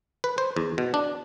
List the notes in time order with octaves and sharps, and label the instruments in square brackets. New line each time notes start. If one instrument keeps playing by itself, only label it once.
[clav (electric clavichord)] B4
C5
E2
B2
D4